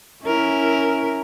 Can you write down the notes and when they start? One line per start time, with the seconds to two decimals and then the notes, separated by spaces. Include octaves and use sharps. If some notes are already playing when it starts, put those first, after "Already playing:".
0.24 C#4 E4 A#4